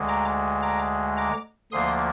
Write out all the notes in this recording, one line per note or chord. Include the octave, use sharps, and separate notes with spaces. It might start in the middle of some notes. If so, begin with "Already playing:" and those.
Already playing: D2 D3 G#3
A#5 D6
A#5 D6
A#5 D6
D2 D3 F3 A#3 C6 D#6